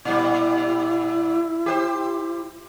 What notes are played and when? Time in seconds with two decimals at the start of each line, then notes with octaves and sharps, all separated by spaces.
0.05 A#2 G3 E4
1.66 G4 B4 C5